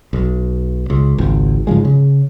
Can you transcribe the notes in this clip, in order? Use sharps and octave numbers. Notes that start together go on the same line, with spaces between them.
B1
C#2
G#1 C#2
G#2 C#3 F3 G#3
C#3